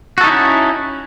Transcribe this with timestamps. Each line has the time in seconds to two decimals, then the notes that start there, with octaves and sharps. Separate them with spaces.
0.18 F#4
0.21 A4
0.24 D#4
0.27 E4
0.30 C#4